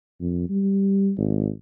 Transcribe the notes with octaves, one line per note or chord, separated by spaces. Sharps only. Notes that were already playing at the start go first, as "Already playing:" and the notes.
F2
G3
G#1